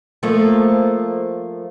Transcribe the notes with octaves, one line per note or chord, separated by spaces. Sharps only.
F3 A3 A#3